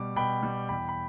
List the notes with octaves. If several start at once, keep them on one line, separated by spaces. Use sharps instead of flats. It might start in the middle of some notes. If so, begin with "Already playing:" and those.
Already playing: B2 G3 D6
B2 G5 B5
G3
E2 G5 B5
B5